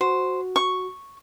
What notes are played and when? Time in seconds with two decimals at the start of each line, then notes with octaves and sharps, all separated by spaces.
0.01 F#4 C5
0.56 C#6